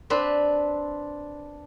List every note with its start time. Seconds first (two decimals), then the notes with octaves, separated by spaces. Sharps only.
0.10 C4 D4 B4